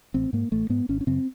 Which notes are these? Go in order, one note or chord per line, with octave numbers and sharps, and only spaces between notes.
A1 C4
G#2 A#3
A1 A3
G#2 B3
G#1 C#4
C#4
F#2 C#3 C4